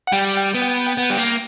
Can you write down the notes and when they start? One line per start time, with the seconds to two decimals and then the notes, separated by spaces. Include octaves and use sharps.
0.07 F#5
0.12 G3 G5
0.54 B3
0.98 B3
1.10 G3
1.18 A#3